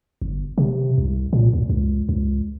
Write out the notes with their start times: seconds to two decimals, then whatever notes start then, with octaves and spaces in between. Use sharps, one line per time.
0.22 G1
0.58 C3
0.98 C2
1.33 A#2
1.53 D2
1.69 C#2
2.09 C#2